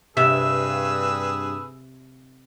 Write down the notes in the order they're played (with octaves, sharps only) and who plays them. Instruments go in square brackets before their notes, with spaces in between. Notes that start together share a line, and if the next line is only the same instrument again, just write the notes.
[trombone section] G2 [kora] C3 [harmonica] G#4 B4 E6 [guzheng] E5